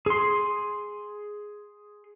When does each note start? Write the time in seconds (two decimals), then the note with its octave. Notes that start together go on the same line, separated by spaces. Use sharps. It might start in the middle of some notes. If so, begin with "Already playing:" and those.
0.06 G#4 C6